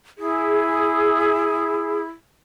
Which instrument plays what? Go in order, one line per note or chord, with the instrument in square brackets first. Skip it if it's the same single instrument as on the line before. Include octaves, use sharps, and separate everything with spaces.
[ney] E4 [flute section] G#4